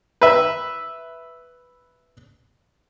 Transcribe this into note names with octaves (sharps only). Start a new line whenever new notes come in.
B4 E5